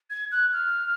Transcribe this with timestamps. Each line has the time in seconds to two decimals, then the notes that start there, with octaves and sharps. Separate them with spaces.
0.10 G#6
0.32 F#6
0.53 F6